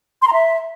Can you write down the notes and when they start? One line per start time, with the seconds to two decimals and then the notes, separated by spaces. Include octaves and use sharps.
0.22 C6
0.27 A#5
0.33 E5